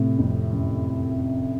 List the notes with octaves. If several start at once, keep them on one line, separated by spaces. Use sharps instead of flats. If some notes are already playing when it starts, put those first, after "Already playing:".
Already playing: A2 C3
F2
F#2